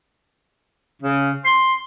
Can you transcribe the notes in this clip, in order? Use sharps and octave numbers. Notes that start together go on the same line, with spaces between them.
C#3
C6